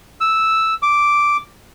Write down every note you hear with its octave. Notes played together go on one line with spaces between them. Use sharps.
E6
D6